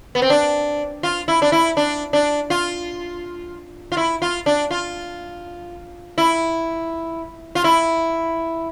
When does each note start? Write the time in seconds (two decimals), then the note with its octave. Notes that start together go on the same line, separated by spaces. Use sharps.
0.15 B3
0.22 C4
0.30 D4
1.03 F4
1.28 E4
1.42 D4
1.52 E4
1.77 D4
2.13 D4
2.50 F4
3.92 F4
3.97 E4
4.22 F4
4.46 D4
4.71 F4
6.18 E4
7.55 F4
7.64 E4